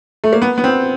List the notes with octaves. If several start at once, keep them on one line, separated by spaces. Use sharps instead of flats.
A3
A#3
B3
B3
C4